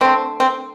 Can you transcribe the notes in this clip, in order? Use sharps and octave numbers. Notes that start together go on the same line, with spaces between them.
D3 A3 C4
C4